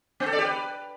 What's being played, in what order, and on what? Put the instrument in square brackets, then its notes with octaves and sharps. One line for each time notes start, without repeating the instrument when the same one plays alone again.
[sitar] B3
A4
D5
G4
B4